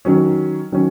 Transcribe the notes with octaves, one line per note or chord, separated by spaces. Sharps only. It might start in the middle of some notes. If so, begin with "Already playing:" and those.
D#3 F#3 C#4
D#3 F#3 C#4